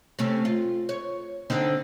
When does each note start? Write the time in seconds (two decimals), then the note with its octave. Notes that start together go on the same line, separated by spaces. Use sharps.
0.19 C3 A3 C#4
0.45 F4
0.89 C#5
1.50 D3 C4 D#4